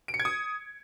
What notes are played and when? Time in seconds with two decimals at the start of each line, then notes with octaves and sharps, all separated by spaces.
0.08 D7
0.14 C#7
0.20 G#6
0.25 D#6